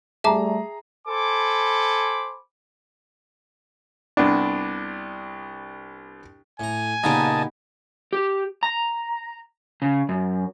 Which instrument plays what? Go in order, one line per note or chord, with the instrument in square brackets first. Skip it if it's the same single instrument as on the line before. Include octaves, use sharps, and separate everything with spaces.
[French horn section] G3 A3 [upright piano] G#4 A#5 [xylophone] E5 A5 D6
[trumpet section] A4 C5 G#5 B5 D6
[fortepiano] C2 B3 D4
[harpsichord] A2 A#5 [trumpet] G#5
[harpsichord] A#2 C#3 A#3 [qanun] B3 D#4 G4 [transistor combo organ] D#5 A5
[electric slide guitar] G4
A#5
C#3
F#2